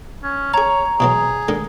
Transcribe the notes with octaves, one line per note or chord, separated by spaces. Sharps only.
C#4
G#4 C#5 A5 A#5
B2 E3 F#3 G#4
D3 D#3 G#3